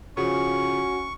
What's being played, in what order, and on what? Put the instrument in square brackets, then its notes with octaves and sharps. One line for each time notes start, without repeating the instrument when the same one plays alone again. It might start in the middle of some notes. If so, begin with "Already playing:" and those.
[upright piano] C#3 F3 [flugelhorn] C#4 [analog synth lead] F#4 [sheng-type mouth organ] C#6